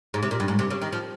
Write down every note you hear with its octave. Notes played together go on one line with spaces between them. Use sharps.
G#2
C3
A#2
G2
G#2
C3
C#3
D#3
F3